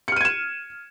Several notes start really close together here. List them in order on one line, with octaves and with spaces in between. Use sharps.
C#7 F6 D#7 G#6 E7